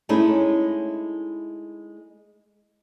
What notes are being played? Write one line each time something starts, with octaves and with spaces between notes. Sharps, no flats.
G#3 A3 C#4 D#4 E4